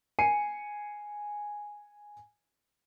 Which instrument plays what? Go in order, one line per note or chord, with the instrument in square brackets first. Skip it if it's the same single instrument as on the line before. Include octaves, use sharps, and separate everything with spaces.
[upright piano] G#5 C7 C#7 D#7